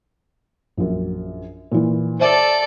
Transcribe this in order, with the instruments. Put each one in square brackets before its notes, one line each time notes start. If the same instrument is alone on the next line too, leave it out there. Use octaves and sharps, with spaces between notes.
[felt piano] A#1 F#2
A#2 E3
[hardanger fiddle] A4 D5 [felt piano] C5 E5